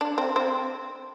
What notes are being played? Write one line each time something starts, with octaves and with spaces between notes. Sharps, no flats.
D4
C4
C4